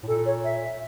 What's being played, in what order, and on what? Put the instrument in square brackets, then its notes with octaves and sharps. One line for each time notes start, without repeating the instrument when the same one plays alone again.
[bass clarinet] A2
[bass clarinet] A#2 [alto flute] A4
[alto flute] C#5
E5